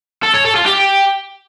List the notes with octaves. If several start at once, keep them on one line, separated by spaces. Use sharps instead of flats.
A4
C#5
A4
F4
G4